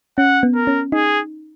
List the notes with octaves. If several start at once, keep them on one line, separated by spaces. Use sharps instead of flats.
C#4 F#5
B3
A#4
C#4
D#4 G#4